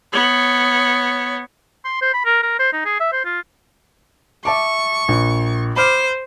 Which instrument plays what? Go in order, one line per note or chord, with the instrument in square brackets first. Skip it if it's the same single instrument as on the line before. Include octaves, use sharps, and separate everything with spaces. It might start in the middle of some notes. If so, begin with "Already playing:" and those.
[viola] B3 C#5
[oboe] C6
C5
B5
A#4
A#4
C5
D#4
G#4
E5
C5
F4
[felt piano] E5 A5 D6 [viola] C#6
[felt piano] A#1
[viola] C5 [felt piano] B5 D6 F6